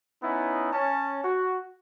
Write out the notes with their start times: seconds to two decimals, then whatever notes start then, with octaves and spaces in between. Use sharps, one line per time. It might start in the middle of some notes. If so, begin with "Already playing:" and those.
0.23 B3 C#4 D#4 E4
0.73 C#4 A5
1.24 F#4